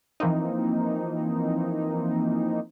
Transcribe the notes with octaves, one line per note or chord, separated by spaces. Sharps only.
E3 F3 A#3 C4 D#4